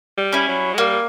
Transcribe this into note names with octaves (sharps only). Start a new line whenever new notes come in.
G3
C#4 E4
F#3
G#3
G3 A#3